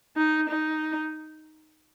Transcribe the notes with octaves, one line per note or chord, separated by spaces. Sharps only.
D#4
D#4